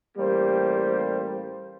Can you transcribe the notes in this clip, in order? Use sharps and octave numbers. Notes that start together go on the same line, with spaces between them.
A1 G3 A#3 G4 C5